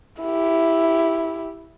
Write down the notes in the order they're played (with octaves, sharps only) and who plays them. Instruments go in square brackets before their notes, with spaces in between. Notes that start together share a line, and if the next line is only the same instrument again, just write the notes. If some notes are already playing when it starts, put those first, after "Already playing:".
[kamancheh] E4 G4